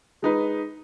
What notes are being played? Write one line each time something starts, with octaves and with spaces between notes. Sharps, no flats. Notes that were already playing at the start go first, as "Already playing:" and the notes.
G#3 D#4 B4